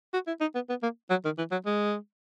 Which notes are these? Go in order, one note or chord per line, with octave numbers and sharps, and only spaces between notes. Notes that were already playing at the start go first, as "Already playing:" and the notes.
F#4
E4
D#4
B3
B3
A#3
F#3
D#3
E3
F#3
G#3